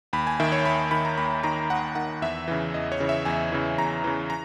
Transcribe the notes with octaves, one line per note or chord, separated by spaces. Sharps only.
D#2 B5
G#5
D#3 E5
C#5
D#2 B5
D#3 B5
A#5
D#2 B5
D#3 A#5
D#2 F#5
D#3 F#5
E2 E5
C#3 E3
E2 D#5
C#5
C#3 E3
E5
E2 G#5
C#3 E3
E2 A#5
C#3 E3
A#5